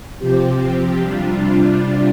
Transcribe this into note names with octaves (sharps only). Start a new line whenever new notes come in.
C3 F3 C4 G4
C3 G3 D4 F4